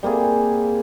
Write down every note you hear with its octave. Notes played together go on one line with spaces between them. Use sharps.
G3 A#3 C4 G#4